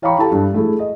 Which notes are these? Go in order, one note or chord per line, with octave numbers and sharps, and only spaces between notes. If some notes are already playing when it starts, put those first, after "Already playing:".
C#5 F5 G5 A#5 B5 C#6
E4 G4 A4 A5
G2
A3 E4 G#4
D#5